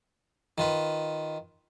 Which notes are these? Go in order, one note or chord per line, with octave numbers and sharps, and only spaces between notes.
D#3 F4 B4